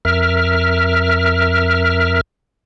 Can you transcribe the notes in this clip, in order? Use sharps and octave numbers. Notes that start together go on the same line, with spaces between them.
F2 A#4 E5 F6